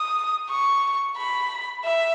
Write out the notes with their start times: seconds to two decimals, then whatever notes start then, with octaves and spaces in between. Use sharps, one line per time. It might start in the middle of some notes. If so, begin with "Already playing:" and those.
Already playing: D#6
0.50 C#6
1.17 B5
1.85 E5